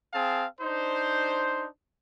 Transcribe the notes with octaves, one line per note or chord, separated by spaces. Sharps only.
C4 G#4 F5 A5
D4 D#4 C5